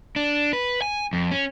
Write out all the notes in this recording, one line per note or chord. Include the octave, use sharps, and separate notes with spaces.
D4
B4
G#5
F2
C#4